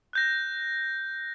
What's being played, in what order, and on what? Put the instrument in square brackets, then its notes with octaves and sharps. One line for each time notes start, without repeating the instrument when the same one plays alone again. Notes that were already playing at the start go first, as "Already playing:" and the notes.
[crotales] F#6 G6 A#6